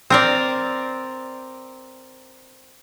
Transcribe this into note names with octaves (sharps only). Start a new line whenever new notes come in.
C4 A#4 D5